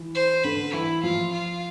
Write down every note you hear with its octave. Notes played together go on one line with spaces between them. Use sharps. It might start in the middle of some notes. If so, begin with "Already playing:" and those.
Already playing: E3
C5
D3 B4
E3 E4
F3 F4
F4